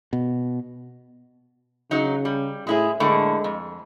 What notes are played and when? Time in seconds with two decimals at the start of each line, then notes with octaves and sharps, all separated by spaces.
0.13 B2
1.91 C#3 F#3 D#4
2.25 G3
2.67 A2 G#3 E4 G#4
3.00 A2 D3 G#3 A#3
3.44 F2